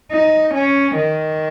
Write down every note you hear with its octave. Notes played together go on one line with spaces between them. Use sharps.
D#4
C#4
D#3